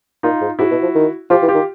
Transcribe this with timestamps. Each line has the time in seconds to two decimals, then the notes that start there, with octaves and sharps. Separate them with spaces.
0.23 A#2 D#4 F4
0.41 G#2
0.59 G#2 E4 F#4
0.71 B2
0.82 F3
0.95 D#3
1.30 F3 F4 G4
1.42 E3
1.48 F4 G4
1.54 D#3